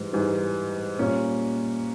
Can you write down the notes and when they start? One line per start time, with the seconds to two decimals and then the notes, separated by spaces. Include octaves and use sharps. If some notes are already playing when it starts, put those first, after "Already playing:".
Already playing: G#2 E3 G3
0.13 G#2 E3 G3
0.99 A#2 G3 A#3 C#4 F4